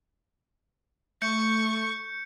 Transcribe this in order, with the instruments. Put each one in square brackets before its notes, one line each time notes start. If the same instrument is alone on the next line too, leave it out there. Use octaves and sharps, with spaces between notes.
[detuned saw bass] A3 [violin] C#6 [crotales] G6 C#7